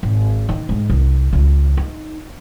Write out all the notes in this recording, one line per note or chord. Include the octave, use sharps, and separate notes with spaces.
G#1
D#3
G#2
C2
C#2
D#4